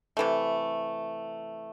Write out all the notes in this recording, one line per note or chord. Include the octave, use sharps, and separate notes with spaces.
C3 E3 A3